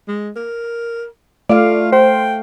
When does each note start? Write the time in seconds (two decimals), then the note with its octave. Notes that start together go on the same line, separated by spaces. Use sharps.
0.08 G#3
0.36 A#4
1.50 A3 F4 D5 F5
1.92 C5 G5